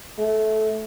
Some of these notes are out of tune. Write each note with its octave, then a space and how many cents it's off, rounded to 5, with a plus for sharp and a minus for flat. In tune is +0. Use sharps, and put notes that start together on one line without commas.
A3 -15